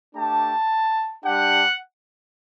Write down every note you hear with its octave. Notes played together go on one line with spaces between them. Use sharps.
A3 D4 G4 A5
G3 D4 G4 F#5